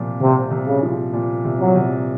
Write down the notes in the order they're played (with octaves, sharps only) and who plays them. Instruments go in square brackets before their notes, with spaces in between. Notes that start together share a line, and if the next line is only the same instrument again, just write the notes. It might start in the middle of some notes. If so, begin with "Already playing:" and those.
Already playing: [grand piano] C2 A#2 F3
[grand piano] C2 [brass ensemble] C3
[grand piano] C2
[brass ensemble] C#3
[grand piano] F3
A#2
C2
[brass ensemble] F#3
[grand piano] C2